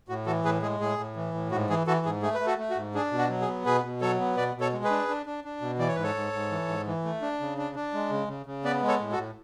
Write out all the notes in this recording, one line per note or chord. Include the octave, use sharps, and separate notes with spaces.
A2 F#4
E3 F#4 A4
A2 G#4 B4
G#3 G#4
A2 G#4
A2
E3
A2
G#2 F#4
E3 G#4
E3 F#4 A4
G#2 G#4
A3 G#4
B4
A3
F#4 A4
A3
F#4
G#2
D4 G#4
B2
F#4
F#3
G#4
B3
B2 G#4 B4
B2
F#3 A4 C#5
B3
B2 B4 D5
B2
A4 C#5
G#3
G#4 B4
D4
D4
D4
D4
B2
E3 D5
C#5
G#2 B4
A4 C#5
G#2
G#2
E3
G#2
E3
A3
D4
C#3
D4
D4
G#3
C#3
C#3
C#3
B3 B4 D5
G#3
A4 C#5
A2
F#4 A4
A2